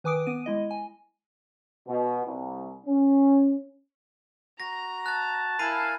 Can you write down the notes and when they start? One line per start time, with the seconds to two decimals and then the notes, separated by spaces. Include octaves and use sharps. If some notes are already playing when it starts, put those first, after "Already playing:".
0.04 D#3 B4 G#5 D6 D#6 D7
0.27 B3 D#7
0.46 G#3 E4 D#5
0.71 G#5
1.87 B2
2.26 C2
2.86 C#4
4.60 F#4 A#5 A#6
5.06 A5 F#6 A6
5.59 E4 A#4 F5 G#5 B5 C7 D#7